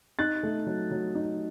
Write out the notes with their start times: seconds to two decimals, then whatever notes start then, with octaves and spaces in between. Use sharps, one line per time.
0.19 D#4 F#6 A6
0.43 A3
0.67 F#3
0.91 F#3
1.15 D#4